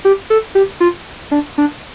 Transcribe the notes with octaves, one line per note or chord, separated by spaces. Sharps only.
G4
A4
G4
F4
D4
D4